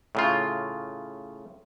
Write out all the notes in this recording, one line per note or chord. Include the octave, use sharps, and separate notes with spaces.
A2 C#3 F4